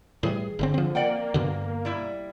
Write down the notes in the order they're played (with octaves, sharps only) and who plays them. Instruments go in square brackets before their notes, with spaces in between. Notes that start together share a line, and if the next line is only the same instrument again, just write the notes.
[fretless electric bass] A2 E3 G3 [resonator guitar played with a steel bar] G#4
[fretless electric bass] G1 A#2 C4 [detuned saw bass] D3
[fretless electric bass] F3 C4
[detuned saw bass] A#3 [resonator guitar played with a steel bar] D5 F#5 G5
[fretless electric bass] G2 B2 D3
[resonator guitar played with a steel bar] G3 E4